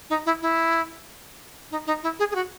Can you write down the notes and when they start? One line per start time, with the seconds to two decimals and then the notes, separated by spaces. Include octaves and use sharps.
0.10 D#4
0.26 E4
0.42 E4
1.71 D#4
1.87 D#4
2.03 E4
2.19 G#4
2.31 G#4
2.35 F#4